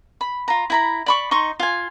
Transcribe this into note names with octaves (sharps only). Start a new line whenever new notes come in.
B5
F4 A#5
E4 A#5 B5
D5 B5 C#6
D#4 C6 C#6
F4 G#5